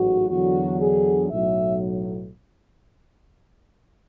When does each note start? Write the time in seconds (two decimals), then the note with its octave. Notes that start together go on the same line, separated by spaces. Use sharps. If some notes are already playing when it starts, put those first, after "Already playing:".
Already playing: A1 G#2 F#3 F#4
0.30 E2 D3 F#3 F#4
0.80 G#4
1.30 B1 A2 F#3 E5